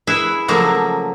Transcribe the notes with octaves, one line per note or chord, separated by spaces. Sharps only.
E4 G#4 B4 E5
C#3 F3 F#3 A3 A#3